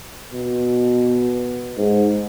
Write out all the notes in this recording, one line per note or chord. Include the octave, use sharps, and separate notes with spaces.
B2
G#2